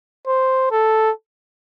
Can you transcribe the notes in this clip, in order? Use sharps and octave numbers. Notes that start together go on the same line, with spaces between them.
C5
A4